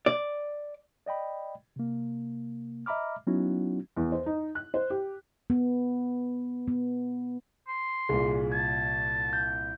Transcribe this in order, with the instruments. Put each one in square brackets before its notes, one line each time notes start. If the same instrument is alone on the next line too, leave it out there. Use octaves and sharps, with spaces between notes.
[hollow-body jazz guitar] D5
[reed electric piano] D5 D#5 G5 B5
C3 A#3
D#5 E5 A#5 B5 D6 F6
F#3 B3 C#4 D#4 E4 F#4
[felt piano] E2
C5
D#4
F#6
C5
G4
[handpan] B3
B3
[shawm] C6
[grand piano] C2 A#2 [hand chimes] G#4
[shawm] A5 [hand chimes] G#6
[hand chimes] G6